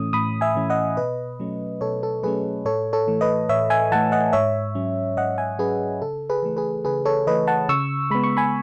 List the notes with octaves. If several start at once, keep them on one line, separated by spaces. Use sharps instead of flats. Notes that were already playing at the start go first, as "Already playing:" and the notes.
Already playing: A2 E3 A3 C#4 D#6
A2 B5 D#6
E5 G#5
E3 A3 C#4
D#5 F#5
B2 B4 D#5
F#3 A3 C#4
B2 A4 C#5
A4
F#3 A3 C#4 G#4 B4
A2 A4 C#5
A4 C#5
E3 A3
B4 D#5
A2 C#5 E5
E5 G#5
E3 A3 F#5 A5
D#5 F#5
G#2 C#5 E5
F#3 C#4
G#2 D#5 F#5
E5 G#5
F#3 C#4 G#4 B4
C#3 A4
G#4 B4
E3 A3
G#4 B4
C#3 G#4 B4
A4 C#5
E3 A3 B4 D#5
F#5 A5
C#3 C#6 E6
G#3 B3 B5
C#6
G#5 B5